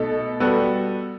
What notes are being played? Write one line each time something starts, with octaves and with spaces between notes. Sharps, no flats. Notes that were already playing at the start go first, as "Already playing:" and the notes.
Already playing: B2 A3 D#4 A4
G3 B3 F#4 A4